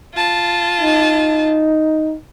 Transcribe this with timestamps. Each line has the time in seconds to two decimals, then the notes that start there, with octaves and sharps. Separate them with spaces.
0.14 F4 A5
0.81 D#4